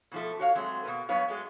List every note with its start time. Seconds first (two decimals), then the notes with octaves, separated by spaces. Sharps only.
0.11 B2 F3 A3
0.39 F#4 C#5 F5
0.55 F#3 G#3 A3 C4
0.83 B2 A#3 B4
1.09 G2 F#3 B3 B4 C#5 F5
1.28 F#3 G#3 A3 B3